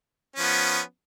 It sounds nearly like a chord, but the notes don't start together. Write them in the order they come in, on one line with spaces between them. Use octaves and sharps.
C#4 F3 B3